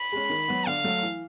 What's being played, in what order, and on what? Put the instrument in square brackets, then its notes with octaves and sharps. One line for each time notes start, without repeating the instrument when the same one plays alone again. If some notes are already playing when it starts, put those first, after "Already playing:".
Already playing: [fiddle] B5
[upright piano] G#3 C#4
D#3
F#3 B3
[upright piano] D3 [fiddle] F5
[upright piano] F#3 A3
E3